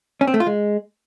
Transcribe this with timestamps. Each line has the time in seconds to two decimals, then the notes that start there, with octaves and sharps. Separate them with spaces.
0.21 C#4
0.27 C4
0.34 A3
0.40 F4
0.47 G#3